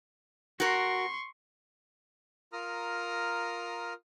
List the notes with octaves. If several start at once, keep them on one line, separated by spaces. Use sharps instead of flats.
F#4 A#4 C6 C#6
F4 A#4 A#5 D#6 F6